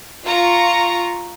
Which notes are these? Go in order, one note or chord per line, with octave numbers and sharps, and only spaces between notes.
F4 A#5 C#6